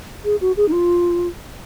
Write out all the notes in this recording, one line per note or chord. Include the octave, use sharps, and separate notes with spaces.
G#4
F#4
G#4
D#4
F4